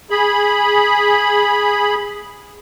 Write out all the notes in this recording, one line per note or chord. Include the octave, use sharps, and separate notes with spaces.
G#4 B5